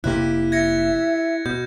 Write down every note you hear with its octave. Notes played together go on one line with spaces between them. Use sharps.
F1 C3 A#3 E4 G4 F#6
E5 G#6 A#6 C#7
B2 G6